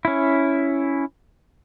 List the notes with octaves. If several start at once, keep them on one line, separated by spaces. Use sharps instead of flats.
C#4 E4